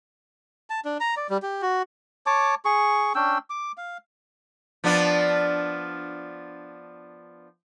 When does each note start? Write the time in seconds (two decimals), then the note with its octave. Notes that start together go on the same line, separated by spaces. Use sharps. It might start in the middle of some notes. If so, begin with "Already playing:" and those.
0.70 A5
0.85 D4
1.00 A#5
1.17 D5
1.30 G3
1.43 G4
1.62 F#4
2.26 C#5 A5 D6
2.65 G#4 C#6
3.15 C#4 D4 G5 E6
3.50 D6
3.78 F5
4.84 F3 B3 D4